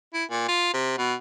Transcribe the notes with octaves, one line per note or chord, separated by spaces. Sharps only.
E4
A#2
F4
C3
B2